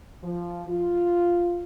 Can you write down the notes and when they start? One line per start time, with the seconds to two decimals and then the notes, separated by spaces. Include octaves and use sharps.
0.23 F3
0.69 F4